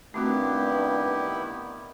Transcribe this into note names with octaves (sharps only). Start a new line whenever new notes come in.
G2 D#3 A3 B3 C4 E4 F#4 G4